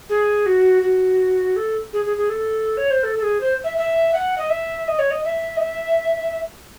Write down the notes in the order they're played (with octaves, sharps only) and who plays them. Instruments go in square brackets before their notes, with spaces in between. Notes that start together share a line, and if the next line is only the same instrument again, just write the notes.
[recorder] G#4
F#4
F#4
A4
G#4
G#4
G#4
A4
C#5
C5
A4
A4
G#4
C5
E5
E5
F#5
D#5
E5
D#5
C#5
D#5
E5
D#5
E5